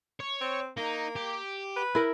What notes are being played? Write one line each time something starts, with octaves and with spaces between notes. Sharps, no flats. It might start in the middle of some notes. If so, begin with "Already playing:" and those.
C#5
C4
A#3 D#4
G4
B4
E4 A#4